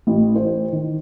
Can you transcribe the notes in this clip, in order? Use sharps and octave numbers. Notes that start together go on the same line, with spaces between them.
A1
C5
D#3